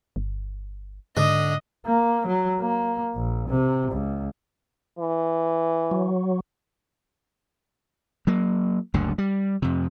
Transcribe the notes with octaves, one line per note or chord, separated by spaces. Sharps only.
G1
G#2 D3 D#5
A#3
F#3
A#3
A#1
C3
C#2
E3
F#3
F#3 A#3
F#1 D2 G2 D3
G3
F2 C3